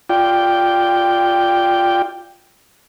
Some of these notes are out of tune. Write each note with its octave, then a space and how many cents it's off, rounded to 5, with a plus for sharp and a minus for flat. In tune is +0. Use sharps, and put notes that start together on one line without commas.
F4 +0 D5 +0 G5 +0